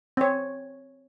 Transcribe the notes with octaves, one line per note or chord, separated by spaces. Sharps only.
C4 C#5